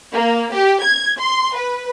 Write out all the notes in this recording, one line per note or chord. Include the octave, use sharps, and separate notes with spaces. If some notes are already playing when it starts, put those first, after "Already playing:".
A#3
G4
G#6
C6
B4